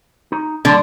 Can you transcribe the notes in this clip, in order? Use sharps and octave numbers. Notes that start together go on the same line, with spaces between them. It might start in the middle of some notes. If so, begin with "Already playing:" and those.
D#4
A2 D3 F#3 C6